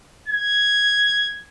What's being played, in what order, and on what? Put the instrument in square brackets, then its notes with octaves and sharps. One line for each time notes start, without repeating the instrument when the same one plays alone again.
[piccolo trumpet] G#6